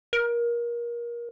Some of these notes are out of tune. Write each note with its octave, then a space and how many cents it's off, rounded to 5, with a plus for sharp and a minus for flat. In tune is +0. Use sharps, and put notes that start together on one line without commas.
A#4 +25